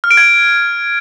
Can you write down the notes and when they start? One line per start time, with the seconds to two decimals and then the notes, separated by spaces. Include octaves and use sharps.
0.04 F6
0.11 D7
0.17 G#6